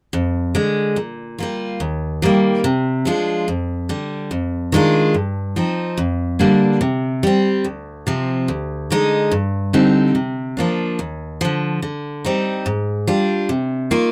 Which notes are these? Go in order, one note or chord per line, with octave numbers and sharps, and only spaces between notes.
F2
D3 G#3
A#2
G3 A#3 F4
D#2
D#3 G3 A#3
C3
F3 G#3 D4 F4
F2
D3 G3
F2
D#3 G#3 D4 F4
G2
F3 C4 D#4
F2
D3 G3 A#3 D4
C3
G3 C4
D2
C3 F3 C4
D2
D3 G#3 D#4
G2
D3 G3 C4 D#4
C3
F3 A#3 D4
D#2
D3 F3
D3
G3 C4 D#4
G#2
G3 D4 F4
C3
D#3 A#3 F4